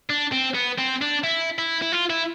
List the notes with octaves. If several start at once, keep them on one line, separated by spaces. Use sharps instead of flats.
D4
C4
B3
C4
D4
E4
E4
E4
F4
E4